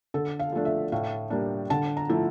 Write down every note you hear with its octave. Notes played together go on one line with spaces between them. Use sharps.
D3 A4
F5
F3 A3 D4
E5
A2 F5
G3 A#3 D4
D3 A5
A#5
F3 A3 E4